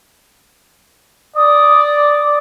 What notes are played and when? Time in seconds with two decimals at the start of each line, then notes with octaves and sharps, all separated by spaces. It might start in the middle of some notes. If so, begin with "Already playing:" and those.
1.36 D5 D#6